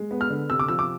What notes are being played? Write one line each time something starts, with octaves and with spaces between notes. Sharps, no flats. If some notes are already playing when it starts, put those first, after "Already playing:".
Already playing: G#3
B3
F6
D3
C3 E6
D6
F3 E6
D6